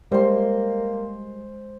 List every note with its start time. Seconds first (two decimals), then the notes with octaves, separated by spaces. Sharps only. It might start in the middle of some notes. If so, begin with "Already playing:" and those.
0.12 G3 G#3 A#3 C5 C6